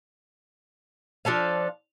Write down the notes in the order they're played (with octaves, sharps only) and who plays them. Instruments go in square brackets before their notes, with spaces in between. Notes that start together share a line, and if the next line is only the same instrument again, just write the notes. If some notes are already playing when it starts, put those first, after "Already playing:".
[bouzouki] F3 D4 A4 F5